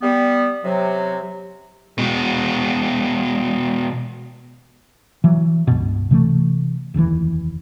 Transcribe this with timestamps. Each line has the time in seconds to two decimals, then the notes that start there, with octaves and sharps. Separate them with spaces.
0.02 G3 B3
0.64 C3 F#3
1.98 B2 G#3
5.24 E3 F#3
5.67 C#2 G2 B2
6.11 C3 E3 G#3 A3
6.94 F1 D#2 A#2 E3